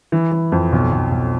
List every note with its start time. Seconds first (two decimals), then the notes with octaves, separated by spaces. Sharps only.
0.12 E3
0.32 E3
0.52 F2
0.72 B1
0.92 B1
1.11 B1